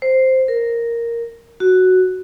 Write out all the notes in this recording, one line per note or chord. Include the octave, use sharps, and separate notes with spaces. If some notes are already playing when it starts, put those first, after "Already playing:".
C5
A#4
F#4